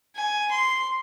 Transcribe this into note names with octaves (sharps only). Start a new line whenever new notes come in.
G#5
C6